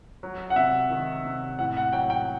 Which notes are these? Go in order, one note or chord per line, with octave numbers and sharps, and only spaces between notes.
F#3
F#5
C3 E5
D#3
C3
A2 F#5
F#5
F#3 G5
G5